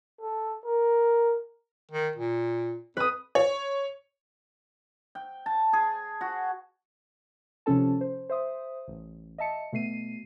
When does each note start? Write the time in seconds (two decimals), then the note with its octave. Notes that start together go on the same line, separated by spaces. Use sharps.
0.21 A4
0.65 A#4
1.92 D#3
2.16 A#2
2.97 F2 B4 D#6
3.35 C#5
5.15 G5
5.46 A5
5.73 G#4
6.21 F#4
7.66 D#2 C3 F3 C#4 A4 A5
8.01 C5
8.29 C5 E5 D#6
8.88 A1
9.38 D#5 E5 A5 C#7
9.73 B2 A3 C7 D#7